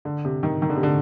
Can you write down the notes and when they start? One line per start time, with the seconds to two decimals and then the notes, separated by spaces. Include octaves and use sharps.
0.05 D3
0.25 C3
0.43 D#3
0.62 D#3
0.70 D3
0.76 C3
0.83 D3